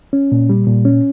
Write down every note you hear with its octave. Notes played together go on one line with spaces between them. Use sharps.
C#4
A#2
G3
A#2
C#4